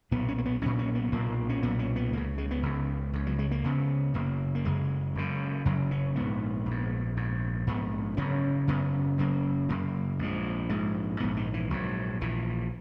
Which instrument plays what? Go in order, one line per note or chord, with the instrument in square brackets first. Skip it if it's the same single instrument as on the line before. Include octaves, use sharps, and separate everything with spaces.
[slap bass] B1 A#2 B3
C#4
A#3
B3
B1 A#2 C#4
C#4
B3
B1 A#2 A#3
C#4
B1 A#2 B3
C#4
B3
C#2 C#3 A#3
G#3
B3
C#2 C#3
C#2 C#3
F#3
G#3
A#3
C#2 C#3 B3
F#1 F#2 C#3 A#3
A#3
F#1 F#2 C#3 G#3
F#1 F#2 C#3
F#1 F#2 C#3 F#3
C#4
A#1 G#2 B3
A#1
G#2
A#1 G#2
A#1 G#2 B3
F#1 F#2 C#3 C#4
F#1 F#2 C#3 B3
F#1 F#2 C#3 A#3
F#1 F#2 C#3 A#3
A#1 G#2 G#3
A#1 G#2 G#3
A#1 G#2 B3
D#3
E3
A#1 G#2 F#3
A#1 A#2 E3